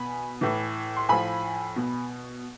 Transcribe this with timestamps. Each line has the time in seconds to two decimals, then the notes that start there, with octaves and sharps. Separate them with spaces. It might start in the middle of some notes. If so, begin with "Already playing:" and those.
Already playing: B2 G#5 B5
0.41 A2 E3
0.97 C6
1.09 A2 F3 G#5 B5
1.76 B2